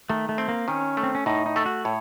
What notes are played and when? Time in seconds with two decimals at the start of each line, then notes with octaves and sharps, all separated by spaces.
0.09 D#3 A3
0.29 A3
0.38 C4
0.48 A#3
0.68 D#3 C#4
0.97 A3
1.03 C4
1.15 C#4
1.26 A2 D#4
1.46 D#4
1.56 A3 A4
1.66 F#4
1.85 A2 C#5